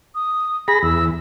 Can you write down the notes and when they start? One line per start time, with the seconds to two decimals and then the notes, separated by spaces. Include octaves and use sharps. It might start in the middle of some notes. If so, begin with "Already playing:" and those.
0.15 D#6
0.68 G#4 B5 A#6
0.83 E2 E6